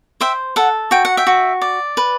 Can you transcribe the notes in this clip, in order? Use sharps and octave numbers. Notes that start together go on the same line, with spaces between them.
C5 E5 G5
A4 F#5
F#4 G5
F#5
E5 G5
F#4
D5
B4